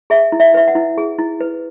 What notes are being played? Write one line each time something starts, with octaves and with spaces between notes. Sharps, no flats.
G#4 E5
E4
E5
B4 E5
F#5
E4
G#4
E4
B4